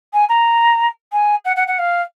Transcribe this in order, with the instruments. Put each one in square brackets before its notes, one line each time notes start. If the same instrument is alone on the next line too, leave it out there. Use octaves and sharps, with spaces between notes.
[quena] G#5
A#5
G#5
F#5
F#5
F#5
F5